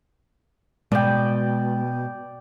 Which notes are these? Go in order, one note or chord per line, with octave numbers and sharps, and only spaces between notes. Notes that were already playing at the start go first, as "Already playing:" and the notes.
B2 G#3 D5 G5